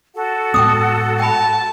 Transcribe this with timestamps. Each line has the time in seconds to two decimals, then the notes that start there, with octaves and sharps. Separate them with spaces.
0.14 F#4 A4 F#5
0.54 A2 G#3 B3 G5 D6 D#6
1.20 G5 A5 B5